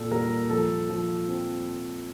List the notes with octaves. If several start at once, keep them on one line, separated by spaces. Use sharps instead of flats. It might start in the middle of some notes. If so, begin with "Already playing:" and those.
Already playing: A#2 A4
G3 A#4
F3 A4
F3
C4